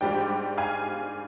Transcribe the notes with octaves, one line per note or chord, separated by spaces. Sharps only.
G#2 G3 D4 G5
F5 G#5